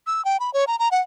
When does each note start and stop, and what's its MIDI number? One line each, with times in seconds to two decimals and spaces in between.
0.07 0.24 88
0.25 0.40 79
0.40 0.52 83
0.54 0.65 73
0.67 0.79 82
0.79 0.89 82
0.91 1.01 78